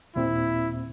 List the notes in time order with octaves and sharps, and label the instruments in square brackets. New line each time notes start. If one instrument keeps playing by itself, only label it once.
[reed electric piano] D#2 A#2 C4 [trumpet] E4